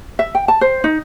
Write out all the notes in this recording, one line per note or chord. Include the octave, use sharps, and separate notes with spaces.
E5
G5
A5
C5
D#4